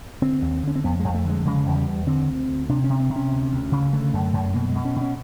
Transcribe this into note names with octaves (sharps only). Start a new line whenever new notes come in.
D3 C4
D#2
D3 C#4
C4
F2 B3
G#3
F2
A3
D3 G#3
C#3 G#3
E2
G3
E2
D3 C4
D2
D2
C3 D4
C#4
C3
C4
C3
C#4
D2
D2
C#3
D3 A3
F#2
F#2
B2 A#3
G#3
B2
C#4
B2
C#4